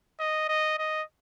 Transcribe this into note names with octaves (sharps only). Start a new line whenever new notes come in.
D#5
D#5
D#5